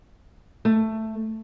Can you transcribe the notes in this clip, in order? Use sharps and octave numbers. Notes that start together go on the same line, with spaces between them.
A3